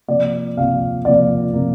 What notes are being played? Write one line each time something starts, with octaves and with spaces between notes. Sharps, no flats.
C3 F3 A#3 D5
C3 F3 A#3 F5
C3 F3 A#3 D5
C3 F3 A#3